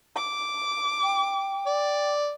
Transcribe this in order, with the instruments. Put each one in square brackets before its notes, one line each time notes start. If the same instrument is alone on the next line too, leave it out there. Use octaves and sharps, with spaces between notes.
[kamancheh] D6
[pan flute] G5
[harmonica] D5